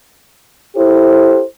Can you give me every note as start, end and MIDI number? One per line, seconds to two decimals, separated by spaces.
0.76 1.42 64
0.76 1.42 67
0.76 1.42 69
0.76 1.42 72